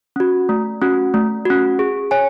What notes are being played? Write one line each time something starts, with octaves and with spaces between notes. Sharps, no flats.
C#4 F#4
A3
C#4 F#4
A3
C#4 F#4
G#4
C#5 G#5